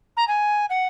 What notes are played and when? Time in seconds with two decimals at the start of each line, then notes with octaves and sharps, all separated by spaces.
0.17 A#5
0.28 G#5
0.70 F#5